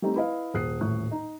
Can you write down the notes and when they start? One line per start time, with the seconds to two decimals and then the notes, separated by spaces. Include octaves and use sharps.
0.02 G3 A3 C4 D#4 G4
0.16 E4 B4 D#5 F5
0.54 D#1 G#4 D#6 F#6 C7
0.81 D#1 A1 A2 C#6 F#6
1.11 D#4